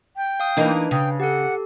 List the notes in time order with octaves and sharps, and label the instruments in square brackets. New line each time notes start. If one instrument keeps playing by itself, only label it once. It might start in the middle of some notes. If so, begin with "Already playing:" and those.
[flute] G5
[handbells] F5 D#6
[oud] E3 A#3 D#4 [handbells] D4 B4
[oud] C#3 [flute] G5
[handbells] G4 A4 [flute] F#5